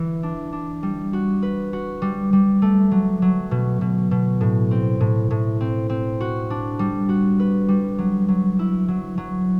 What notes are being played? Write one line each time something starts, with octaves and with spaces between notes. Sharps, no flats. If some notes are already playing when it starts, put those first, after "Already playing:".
Already playing: E3
D4
D4
G3
F#4
B4
F#4
G3
G3
A3
F#3
F#3
B2
B2
B2
A2
C4
A2
A2
C4
C4
F#4
D4
G3
F#4
B4
G3
F#3
F#3
E4
F#3
F#3